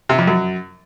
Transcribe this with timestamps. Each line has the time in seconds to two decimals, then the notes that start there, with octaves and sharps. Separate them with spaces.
0.09 C3
0.18 F2
0.27 F#2